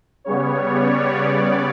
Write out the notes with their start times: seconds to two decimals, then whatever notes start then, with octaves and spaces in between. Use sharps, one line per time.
0.24 C#3 G3 B3 C#5
0.69 D5